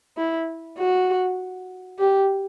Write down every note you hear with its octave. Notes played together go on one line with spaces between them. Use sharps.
E4
F#4
G4